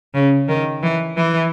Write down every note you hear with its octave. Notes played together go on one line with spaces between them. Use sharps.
C#3
D#3
E3
E3